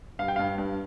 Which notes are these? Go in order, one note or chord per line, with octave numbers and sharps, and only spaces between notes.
G2 F5
G5
G2 F5
G2